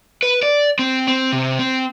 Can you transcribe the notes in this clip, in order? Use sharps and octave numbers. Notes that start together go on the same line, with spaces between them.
B4
D5
C4
C4
C3
C4